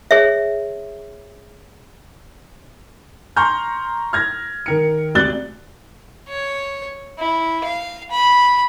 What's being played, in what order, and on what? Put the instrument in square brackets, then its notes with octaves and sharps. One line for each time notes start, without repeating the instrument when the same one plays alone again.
[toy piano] G#4 C#5 E5
[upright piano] A#5 C6 C#6 F6 G6
F6 G#6 A#6
D#3 A#4 C#7
D2 C3 D5 F#6 A6 G7
[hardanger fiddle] C#5
E4
F5
B5